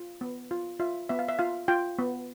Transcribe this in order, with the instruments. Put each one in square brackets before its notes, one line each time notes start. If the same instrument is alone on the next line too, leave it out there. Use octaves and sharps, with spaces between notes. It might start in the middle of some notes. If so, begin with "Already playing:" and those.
Already playing: [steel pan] F4
B3
F4
F4 E5
B3 E5
F5
E5
F4 F5
F4 G5
B3